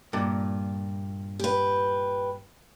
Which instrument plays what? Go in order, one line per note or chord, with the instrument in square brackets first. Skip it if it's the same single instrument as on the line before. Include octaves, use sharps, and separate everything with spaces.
[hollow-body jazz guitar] G2 A#2
[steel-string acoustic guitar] G4 B4